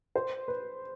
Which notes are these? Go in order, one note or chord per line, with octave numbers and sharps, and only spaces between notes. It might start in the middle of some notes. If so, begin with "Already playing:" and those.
C5
B4